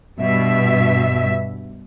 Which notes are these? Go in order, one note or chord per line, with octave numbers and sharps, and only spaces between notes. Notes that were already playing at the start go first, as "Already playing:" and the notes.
G2 B2 E5